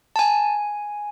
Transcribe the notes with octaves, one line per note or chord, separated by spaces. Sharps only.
A5
G#5